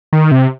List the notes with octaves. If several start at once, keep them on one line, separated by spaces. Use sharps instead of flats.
D#3
C3